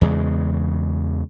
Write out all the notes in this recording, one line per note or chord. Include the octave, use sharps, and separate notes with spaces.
E2 C#3 G#3